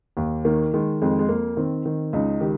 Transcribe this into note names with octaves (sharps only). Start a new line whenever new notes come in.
D#2
D#3 A#3
D#3 G#3
F2 G#3
G#3
F2 A#3
D#3 C4
D#3
C#2 D#4
D#3 G4